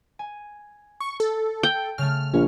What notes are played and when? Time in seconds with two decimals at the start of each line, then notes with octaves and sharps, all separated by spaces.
0.19 G#5
1.00 C#6
1.20 A4
1.63 G5
1.98 C#3 A3 F6
2.33 A#1 C#4